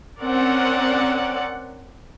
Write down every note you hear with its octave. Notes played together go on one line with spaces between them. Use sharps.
C4 C#4 A#4 D5 F#5